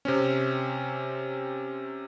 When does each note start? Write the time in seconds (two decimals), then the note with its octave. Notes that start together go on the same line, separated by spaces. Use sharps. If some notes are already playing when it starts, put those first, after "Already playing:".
0.05 C3 C4 C#4